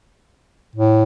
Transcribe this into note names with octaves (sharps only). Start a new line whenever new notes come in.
A2